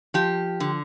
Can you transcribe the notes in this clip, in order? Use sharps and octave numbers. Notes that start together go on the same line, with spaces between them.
F3 G4
D3